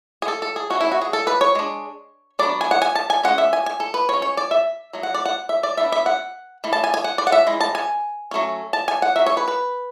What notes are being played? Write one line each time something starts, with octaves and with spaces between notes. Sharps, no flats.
G#4
A4
A4
G#4
E3 A3 C#4 F#4
E4
F#4
G#4
A4
B4
C#5
G#3 D4
F#3 B3 D4 D5
G#5
F#5
G#5
A5
G#5
G#3 C#4 F#5
E5
G#5
G#5
A4
B4
G#3 C#4 C#5
C#5
D5
E5
F#3 A3
F#5
D5
F#5
E5
D5
E3 B3 D4 E5
E5
F#5
E3 A3
A5
G#5
G#5
F#5
D5
F#5
E5
E3 G#3
A5
G#5
F#3 A3 C#4
A5
G#5
F#5
F#3 C#4 E5
C#5
B4
B4